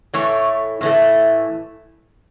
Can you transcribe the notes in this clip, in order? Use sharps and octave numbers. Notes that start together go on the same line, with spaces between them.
A2 E3 A3 C#5
A2 E3 A3